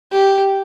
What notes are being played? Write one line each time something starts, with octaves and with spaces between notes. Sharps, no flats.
G4